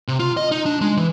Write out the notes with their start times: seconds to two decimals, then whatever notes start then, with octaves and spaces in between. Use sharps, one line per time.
0.08 C3
0.19 F4
0.37 D#5
0.51 D#4
0.66 D4
0.81 G#3
0.97 E3